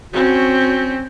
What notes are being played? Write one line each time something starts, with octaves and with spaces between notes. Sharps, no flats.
C4 C#4 F#4